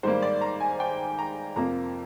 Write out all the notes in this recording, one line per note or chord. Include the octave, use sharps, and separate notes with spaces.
G#2 D#3 G3 A#3 C5
D5
A#5
G#5
G5
A#5
F2 C3 F3 A#3 A#5